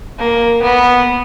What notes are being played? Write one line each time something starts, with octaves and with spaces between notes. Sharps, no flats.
A#3
B3